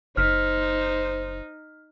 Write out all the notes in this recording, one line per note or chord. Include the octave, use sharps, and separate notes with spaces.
F#1 D#4 C5 F6 B6